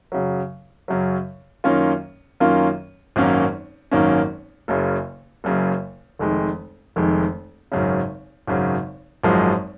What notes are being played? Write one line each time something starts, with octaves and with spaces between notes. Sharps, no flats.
F#2 C#3 F#3
F#2 C#3 F#3
F#2 D#3 A#3 C#4 F4
F#2 D#3 A#3 C#4 F4
G#1 F#2 D#3 A#3 C#4
G#1 F#2 D#3 A#3 C#4
F#1 F#2 C#3
F#1 F#2 C#3
F1 F2 D#3 G#3
F1 F2 D#3 G#3
G#1 F#2 C#3
G#1 F#2 C#3
G#1 F#2 F3 G#3